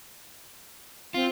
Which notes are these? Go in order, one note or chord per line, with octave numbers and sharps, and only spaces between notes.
C4 F4